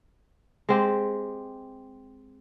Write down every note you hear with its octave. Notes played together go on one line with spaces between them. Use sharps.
G#3 C4 G4